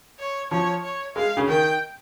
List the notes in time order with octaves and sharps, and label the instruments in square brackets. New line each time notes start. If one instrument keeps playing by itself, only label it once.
[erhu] C#5
[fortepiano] F3 [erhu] C#5
[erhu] C#5
[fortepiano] G#3 [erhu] F5
[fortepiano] C#3
[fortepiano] D#3 [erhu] G5